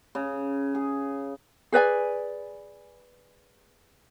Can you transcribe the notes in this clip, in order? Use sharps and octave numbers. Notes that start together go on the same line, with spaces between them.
C#3
G#4
G#4 B4 D5 G#5